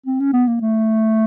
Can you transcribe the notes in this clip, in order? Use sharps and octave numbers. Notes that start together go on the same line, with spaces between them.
C4
C#4
B3
A#3
A3